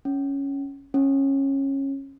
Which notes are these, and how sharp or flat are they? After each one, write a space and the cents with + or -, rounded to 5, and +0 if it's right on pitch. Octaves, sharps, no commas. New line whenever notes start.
C#4 +0
C#4 -20